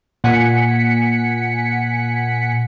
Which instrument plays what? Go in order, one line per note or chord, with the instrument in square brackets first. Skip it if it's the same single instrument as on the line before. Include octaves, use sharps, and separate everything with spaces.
[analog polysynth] A#2 F#5 G#5 B6 C#7